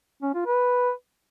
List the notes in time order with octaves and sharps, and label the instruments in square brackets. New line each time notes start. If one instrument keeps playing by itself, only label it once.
[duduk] C#4
F4
B4